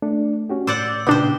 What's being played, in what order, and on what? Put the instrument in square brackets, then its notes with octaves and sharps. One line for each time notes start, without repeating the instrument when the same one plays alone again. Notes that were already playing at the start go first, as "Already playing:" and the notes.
[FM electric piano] A3 [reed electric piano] D4
[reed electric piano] C#4 F#4 G4
[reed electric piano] A2 [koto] C5 D5 F#5 [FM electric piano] D6 E6 G6
[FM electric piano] A#2 C#3 [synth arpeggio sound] B3 D4 [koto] G4 C5